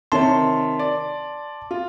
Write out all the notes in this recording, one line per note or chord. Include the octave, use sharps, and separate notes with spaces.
C3 D#3 C#5 A5 C6
D5
F4